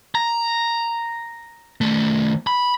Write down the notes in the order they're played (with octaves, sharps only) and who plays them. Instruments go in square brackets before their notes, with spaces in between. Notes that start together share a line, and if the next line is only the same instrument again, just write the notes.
[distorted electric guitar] A#5
D#3 A3
B5